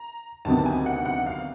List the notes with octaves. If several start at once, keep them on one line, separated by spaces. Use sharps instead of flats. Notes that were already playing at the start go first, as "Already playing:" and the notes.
Already playing: A#5
D2 C3 D#3 F#3 B3 A5
G#5
F#5
F#5
F5